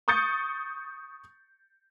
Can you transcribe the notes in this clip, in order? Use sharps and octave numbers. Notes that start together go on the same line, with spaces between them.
C#6 D#6 G6 A6 C#7